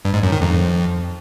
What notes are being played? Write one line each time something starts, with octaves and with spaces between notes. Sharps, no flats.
G2
G#2
F#2
D#3
F2